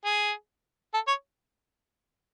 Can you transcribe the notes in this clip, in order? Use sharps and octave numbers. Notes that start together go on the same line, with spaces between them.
G#4
A4
C#5